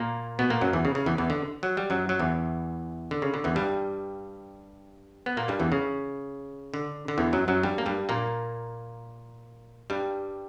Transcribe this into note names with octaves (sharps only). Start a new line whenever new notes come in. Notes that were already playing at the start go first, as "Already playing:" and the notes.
Already playing: A#2 A#3
B2 B3
A#2 A#3
F#2 F#3
E2 E3
C#3
C#3
E2 E3
E2 E3
D3
F#3
G3
F#2 F#3
F#3
E2 E3
D3
C#3
D3
E2 E3
G2 G3
B3
A#2 A#3
G2 G3
E2 E3
C#3
D3
D3
E2 E3
F#2 F#3
F#2 F#3
G2 G3
A#3
G2 G3
A#2 A#3
G2 G3